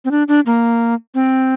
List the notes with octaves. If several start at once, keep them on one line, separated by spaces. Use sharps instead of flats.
C4
D4
D4
A#3
C4